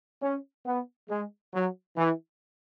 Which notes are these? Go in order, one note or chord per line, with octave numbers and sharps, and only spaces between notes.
C#4
B3
G#3
F#3
E3